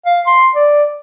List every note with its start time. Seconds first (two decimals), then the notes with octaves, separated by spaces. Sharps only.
0.06 F5
0.27 C6
0.55 D5